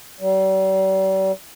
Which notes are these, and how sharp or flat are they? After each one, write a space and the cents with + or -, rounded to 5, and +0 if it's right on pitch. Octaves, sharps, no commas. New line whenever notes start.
G3 -40